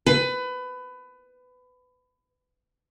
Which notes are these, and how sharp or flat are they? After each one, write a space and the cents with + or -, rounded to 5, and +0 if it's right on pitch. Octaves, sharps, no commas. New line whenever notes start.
B4 +25